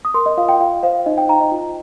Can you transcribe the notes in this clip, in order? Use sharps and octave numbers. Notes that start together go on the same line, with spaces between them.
D#6
A#4 C6
D#5
F4 F5
G5
F4 F5
C5 F5
D#4 D#5
G5
D#4 A#5
D#5
F4